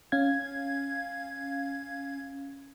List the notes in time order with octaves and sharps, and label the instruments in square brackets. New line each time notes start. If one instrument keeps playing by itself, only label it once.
[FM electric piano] C#4 F5 G#6